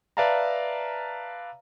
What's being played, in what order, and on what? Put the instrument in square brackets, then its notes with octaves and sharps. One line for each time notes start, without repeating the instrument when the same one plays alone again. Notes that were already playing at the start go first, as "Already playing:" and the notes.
[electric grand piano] B4 D5 E5 F5 A5 A#5